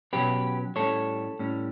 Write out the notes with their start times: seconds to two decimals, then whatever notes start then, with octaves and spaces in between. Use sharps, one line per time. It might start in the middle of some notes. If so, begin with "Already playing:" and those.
0.13 B2 F#3 C#4 G4 B4
0.76 A2 G3 C#4 A4 C#5
1.39 A2 G3 C#4